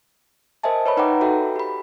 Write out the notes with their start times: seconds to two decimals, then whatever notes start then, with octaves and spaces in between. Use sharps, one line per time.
0.63 A#4 C5 D#5 E5 G#5 A5
0.86 B4 C#5 E5 B5
0.97 D#4 B4 F#5 G5 A#5 D6
1.21 F#4 A4 E5 G5
1.56 G4 B5